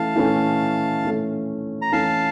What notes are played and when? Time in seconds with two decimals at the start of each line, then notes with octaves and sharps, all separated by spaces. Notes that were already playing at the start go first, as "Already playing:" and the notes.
Already playing: E3 A3 C#4 F5 A5
0.16 E3 A3 C#4
1.04 E3 A3 C#4
1.82 A#5
1.92 E3 A3 C#4 F5 A5